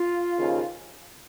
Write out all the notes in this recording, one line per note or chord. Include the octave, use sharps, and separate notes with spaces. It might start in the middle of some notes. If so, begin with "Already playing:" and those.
Already playing: F4
D#2 C#3 F3